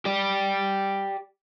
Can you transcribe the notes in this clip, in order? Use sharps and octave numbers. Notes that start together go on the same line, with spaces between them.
G4 D5